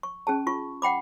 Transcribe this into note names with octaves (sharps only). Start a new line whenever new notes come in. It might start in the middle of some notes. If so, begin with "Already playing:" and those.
C#6
C#4 G#4 A5
F4 C#6
F#5 G5 B5 D6